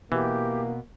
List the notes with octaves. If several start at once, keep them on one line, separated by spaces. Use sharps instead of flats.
B2 E3 A#3 G4